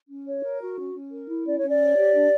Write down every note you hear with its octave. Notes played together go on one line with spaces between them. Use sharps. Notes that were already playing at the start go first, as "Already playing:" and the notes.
C#4
C#5
A#4
F#4
C#4
C#4
A#4
E4
C#4 D5
C#5
C#4
D5
C#5
G4
D4